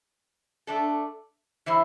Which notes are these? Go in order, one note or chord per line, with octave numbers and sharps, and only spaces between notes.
A3 D4 A4
E3 G3 E4 C5